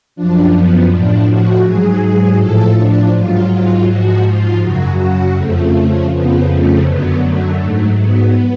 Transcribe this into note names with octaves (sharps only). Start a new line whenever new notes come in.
F#2 F3 D4
B3
A2 F3 D4
F#4
G#2 F#3 G#4
G#4
A2 F3 A4
D4
G#2 F#3 F4
F4
G#2 F3 F#4
F4
F#2 C#3 F#3 F#4
F#4
F2 C#3 F3 A3
F2 C#3 F3 B3
A3
F#2 D3 F#3 B3
A3
G#2 F#3 A3
B3